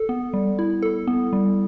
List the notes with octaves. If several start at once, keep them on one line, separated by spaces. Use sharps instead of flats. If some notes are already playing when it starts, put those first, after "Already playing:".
Already playing: A4
B3
G3
E4
A4
B3
G3